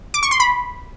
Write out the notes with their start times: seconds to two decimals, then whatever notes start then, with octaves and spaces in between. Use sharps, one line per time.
0.14 D6
0.23 C#6
0.31 C6
0.40 B5